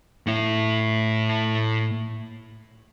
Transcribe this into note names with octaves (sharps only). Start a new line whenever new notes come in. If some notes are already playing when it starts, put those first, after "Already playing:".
A2 E4